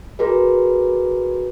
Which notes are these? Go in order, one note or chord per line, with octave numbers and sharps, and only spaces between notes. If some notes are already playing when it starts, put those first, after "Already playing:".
F#4 G#4 A#4 B4